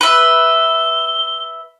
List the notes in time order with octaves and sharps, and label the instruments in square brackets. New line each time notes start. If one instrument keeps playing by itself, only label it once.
[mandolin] B4 E5 [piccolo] G7